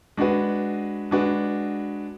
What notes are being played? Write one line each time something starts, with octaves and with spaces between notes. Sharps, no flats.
G#3 D4 F#4 B4
G#3 D4 F#4 B4